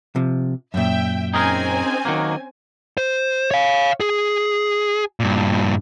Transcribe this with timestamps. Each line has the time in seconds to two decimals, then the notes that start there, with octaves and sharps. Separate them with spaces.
0.16 C3 F3
0.74 F#2 A#2 E5 G5
1.34 C4 C#4 D#4 G#4 A#4 G#5
2.05 D#3 F#3 A#3
2.97 C5
3.51 C#5 F5
4.00 G#4
5.20 G2 A#2